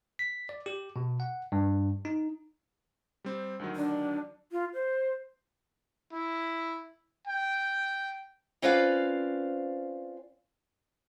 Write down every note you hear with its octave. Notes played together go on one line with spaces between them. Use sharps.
B6
D5
G4
B2
F#5
G2
D#4
G3 C4
D2 D#3 F#3
D4
F4
C5
E4
G5
C4 C#4 F4 B4 D5 F5